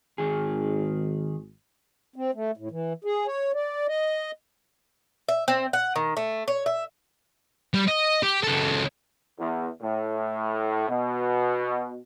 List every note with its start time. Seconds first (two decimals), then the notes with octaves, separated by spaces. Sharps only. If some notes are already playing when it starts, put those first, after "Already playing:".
0.18 G#1 D#3 G#4
2.16 C4
2.34 A3
2.57 A2
2.71 E3
3.04 G#4
3.27 C#5
3.54 D5
3.88 D#5
5.29 E5
5.48 C4
5.73 F#5
5.96 D#3
6.17 A3
6.48 C#5
6.66 E5
7.74 G3
7.88 D#5
8.23 G4
8.43 C#2 A4
9.39 E2
9.81 A2
10.89 B2